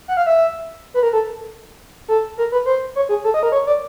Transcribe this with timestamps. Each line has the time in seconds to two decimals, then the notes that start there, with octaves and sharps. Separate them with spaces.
0.08 F#5
0.17 F5
0.26 E5
0.94 B4
1.03 A#4
1.13 A4
2.08 A4
2.38 A#4
2.52 B4
2.66 C5
2.96 C#5
3.09 G#4
3.24 A4
3.34 D#5
3.43 A#4
3.52 C#5
3.67 D5